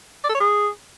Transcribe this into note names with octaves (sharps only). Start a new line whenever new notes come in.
D5
A4
C#5
G#4